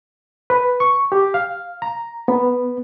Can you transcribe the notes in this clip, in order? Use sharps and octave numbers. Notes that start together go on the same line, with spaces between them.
B4
C#6
G4
F5
A#5
B3